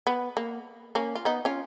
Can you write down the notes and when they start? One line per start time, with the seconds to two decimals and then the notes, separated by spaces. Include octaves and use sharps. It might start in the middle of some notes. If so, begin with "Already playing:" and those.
0.07 B3
0.37 A#3
0.95 A#3 C#4
1.15 F4
1.25 B3 D#4
1.45 C#4 F4